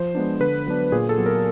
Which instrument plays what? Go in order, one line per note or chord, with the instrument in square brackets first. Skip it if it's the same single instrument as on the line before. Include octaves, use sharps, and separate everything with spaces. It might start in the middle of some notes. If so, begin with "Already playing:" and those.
Already playing: [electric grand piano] F3 C5
G#3 B3 D4
D3 B4
F#3 B3 D4
A#2 G#4
A4
F#3 B3
A#4